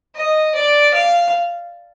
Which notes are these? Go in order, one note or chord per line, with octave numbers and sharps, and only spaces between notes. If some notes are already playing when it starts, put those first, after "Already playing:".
D#5
D5
F5